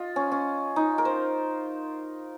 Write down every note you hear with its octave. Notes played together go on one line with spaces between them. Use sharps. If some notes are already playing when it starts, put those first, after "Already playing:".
Already playing: F4 D#5
C#4
C#4
D#4
A#4
C5